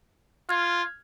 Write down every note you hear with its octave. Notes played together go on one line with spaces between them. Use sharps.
F4 F6 G#6